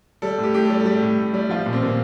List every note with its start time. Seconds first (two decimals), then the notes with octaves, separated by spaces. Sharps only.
0.22 G3 A4
0.38 A2
0.43 G4
0.54 A2 G4
0.65 A4
0.70 G3
0.80 A4
0.86 G3 G4
1.02 A2
1.19 A2
1.34 G3
1.49 F3 F4
1.66 A#2
1.73 C4
1.82 A#2 A#3